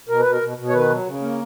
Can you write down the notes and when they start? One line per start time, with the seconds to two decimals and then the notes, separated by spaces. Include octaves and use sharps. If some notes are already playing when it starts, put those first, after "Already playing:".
0.09 B2 A#4
0.20 B4
0.26 B2
0.32 A#4
0.41 B2
0.57 B2
0.69 C#5
0.73 D#3 B4
0.90 F#3
1.06 C#3
1.21 A#3